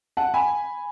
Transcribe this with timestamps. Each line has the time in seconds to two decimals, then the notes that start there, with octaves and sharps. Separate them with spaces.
0.17 F#5 A5
0.34 G#5 B5